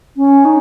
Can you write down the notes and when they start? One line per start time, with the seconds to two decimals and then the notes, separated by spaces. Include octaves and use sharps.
0.17 C#4
0.45 D#4